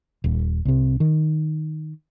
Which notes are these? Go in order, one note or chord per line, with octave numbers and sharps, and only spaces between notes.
D#1
C2 C3
D#3